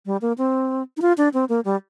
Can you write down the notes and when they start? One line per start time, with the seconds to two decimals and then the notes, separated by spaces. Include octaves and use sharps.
0.06 G3
0.22 A#3
0.38 C4
0.97 D#4
1.02 F4
1.18 D4
1.34 C4
1.49 A#3
1.65 G3